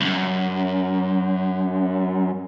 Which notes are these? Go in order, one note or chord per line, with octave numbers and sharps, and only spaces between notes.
C2 F#2